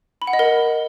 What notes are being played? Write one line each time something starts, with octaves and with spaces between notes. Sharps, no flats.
B5
F#5
D#5
A#4